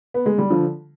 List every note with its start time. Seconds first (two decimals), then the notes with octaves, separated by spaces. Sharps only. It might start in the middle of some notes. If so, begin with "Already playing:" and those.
0.14 B3
0.26 G#3
0.38 G3
0.50 D3 F3